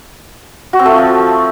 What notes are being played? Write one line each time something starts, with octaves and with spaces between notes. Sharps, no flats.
F#4
C4
A3
F4
F3